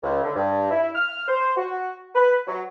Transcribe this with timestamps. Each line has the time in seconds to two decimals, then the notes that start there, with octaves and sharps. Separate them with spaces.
0.03 C#2
0.24 D3
0.35 G2
0.71 E4
0.95 F6
1.28 C5
1.57 F#4
2.15 B4
2.47 F#3